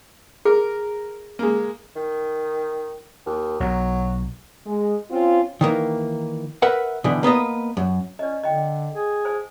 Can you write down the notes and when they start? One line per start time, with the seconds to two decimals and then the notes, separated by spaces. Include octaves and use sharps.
0.45 G#4 A#4
1.39 G#3 A#3
1.96 D#3
3.26 D#2
3.60 B1 B2 F#3
4.66 G#3
5.10 C4 C#4 F4
5.61 D#3 E3 A#3
6.62 A#4 B4 E5 F#5
7.04 B2 D3 E3 G3
7.23 A#3 B3 B4 D#5
7.77 F#2
8.19 C#4 D5 D#5
8.44 D3 D#5 G5
8.94 G#4
9.25 C5 G#5